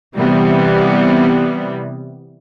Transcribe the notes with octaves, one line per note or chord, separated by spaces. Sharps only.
C3 E3 G3 B3